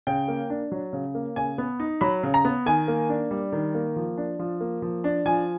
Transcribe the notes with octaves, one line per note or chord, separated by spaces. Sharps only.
C#3 G5
A#3
D4
F#3
C#3
A#3
C#3 G#5
B3
D#4
F#3 B5
C#3
A#5
B3
D#3 G#5
A#3
D4
G3
D#3
A#3
F3
D4
F3
A#3
F3
D4
F3 G#5